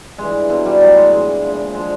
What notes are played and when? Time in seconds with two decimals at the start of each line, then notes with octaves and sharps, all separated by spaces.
0.18 G2 E3 G#3
0.50 B2 F#3 G#3
0.66 G3
0.81 A2 F#3 G3
0.97 G#3
1.13 G2 E3 G#3
1.44 A#2 F3
1.74 D3 F3 G#3